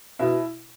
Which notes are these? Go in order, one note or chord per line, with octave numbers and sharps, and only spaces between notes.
B2 E4